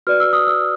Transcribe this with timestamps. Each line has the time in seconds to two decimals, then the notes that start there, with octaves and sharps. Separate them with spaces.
0.07 F#4 B4 D5 F6
0.20 E6
0.33 D#6
0.47 E6